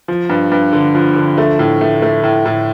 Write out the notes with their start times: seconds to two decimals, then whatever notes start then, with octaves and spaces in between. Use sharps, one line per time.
0.08 F3
0.29 G2
0.52 G2
0.73 D3
0.95 F3
1.16 D3
1.38 A3
1.59 A2
1.81 A3
2.02 A3
2.24 A2
2.45 A2